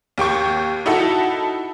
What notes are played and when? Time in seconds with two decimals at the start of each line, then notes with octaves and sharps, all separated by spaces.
0.18 D#2 G4 G5 C#6
0.86 D#4 E4 F#4 A4